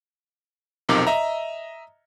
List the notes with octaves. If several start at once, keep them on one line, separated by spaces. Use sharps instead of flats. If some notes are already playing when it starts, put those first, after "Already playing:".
B1 F2 C3 D#4 A#4 D6
D#5 E5 A#5